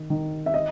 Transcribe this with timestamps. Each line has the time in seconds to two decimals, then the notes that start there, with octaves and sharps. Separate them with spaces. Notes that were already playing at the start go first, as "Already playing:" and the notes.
Already playing: D#3
0.10 D#3
0.46 E5
0.54 D#5